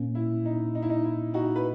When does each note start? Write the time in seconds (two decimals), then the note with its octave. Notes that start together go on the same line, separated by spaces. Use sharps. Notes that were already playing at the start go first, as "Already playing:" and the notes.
Already playing: A#2 A#3 C#4
0.15 E4
0.45 D#4
0.75 D#4
0.82 E4
0.90 D#4
1.04 E4
1.34 D#4 F#4
1.56 B4